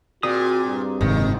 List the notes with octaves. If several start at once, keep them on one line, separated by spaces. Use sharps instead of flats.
A#2 C4 F#4 G#4 D#6
G2
F#1 G#2 C3 D#3